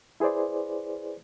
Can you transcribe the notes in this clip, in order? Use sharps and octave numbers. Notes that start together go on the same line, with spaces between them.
E4 G#4 B4 C5 D5